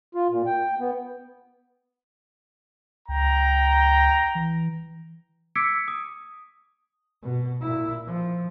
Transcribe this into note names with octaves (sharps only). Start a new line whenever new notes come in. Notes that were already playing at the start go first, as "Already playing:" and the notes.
F4
A#2
G5
B3
C#2 G5 A#5
E3
D6 E6 G#6 B6 C#7 D7
D#6
B2
A#2 E4
F3